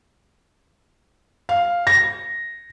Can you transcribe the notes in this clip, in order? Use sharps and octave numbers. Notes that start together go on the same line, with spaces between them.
F5
A#6